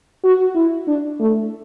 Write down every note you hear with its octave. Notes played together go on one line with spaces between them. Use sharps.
F#4
E4
D4
A3